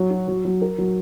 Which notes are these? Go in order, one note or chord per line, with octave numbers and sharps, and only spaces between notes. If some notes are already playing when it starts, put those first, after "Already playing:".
Already playing: F#3 C#5
F#4
F#3
F#3
A#4
F#3